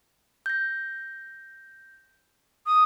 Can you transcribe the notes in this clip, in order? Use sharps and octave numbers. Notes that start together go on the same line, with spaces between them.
G6 A#6
D#6